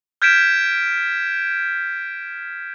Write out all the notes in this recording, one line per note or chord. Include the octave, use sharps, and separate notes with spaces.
F6 G6 G#6 B6 D7 E7